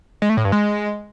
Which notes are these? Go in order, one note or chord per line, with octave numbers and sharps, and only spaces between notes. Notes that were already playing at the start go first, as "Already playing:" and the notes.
G#3
A3
A2
G2
G#3